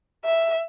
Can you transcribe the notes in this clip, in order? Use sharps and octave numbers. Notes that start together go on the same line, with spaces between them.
E5